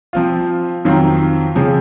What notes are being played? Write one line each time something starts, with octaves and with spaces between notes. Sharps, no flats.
F3 C4 F4
F2 D#3 F#3 C4 F4
C#3 F3 C4